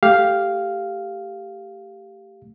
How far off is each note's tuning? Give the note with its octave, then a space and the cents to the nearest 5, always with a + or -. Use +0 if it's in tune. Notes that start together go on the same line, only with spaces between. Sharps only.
A3 +0 G4 +0 F5 +0